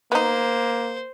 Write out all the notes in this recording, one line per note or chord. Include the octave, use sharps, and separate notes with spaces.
A#3 B3 D#4 C5